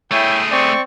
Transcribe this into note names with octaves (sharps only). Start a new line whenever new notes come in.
A3 E4 G#4 C#5 G5
C4 D5 C#6